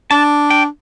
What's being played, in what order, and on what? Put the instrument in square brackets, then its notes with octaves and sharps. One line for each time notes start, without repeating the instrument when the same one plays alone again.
[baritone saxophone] D4 [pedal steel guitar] A5
[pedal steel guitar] G5